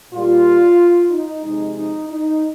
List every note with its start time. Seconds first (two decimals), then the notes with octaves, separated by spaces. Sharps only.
0.12 A#2 G3 F4
1.09 D#4
1.42 C3 F3 G#3 D#4
1.75 D#4
2.08 D#4